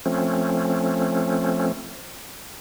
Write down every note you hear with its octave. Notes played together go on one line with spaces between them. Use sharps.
F3 A3 C4 C#4